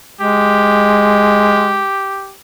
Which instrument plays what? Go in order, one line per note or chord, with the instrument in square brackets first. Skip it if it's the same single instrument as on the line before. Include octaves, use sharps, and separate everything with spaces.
[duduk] G#3 [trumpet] G4